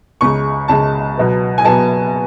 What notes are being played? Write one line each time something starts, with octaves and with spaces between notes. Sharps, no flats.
C#2 C#3 G#3 C#6
C#2 C#3 G#3 A5
B2 F#3 B3
G#5
B2 F#3 B3 A5